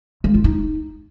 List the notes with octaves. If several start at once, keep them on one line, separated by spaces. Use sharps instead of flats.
G#3
F4
D#4